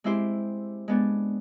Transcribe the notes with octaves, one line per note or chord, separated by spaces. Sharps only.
G#3 C4 E4 G4 C5
G#3 B3 D4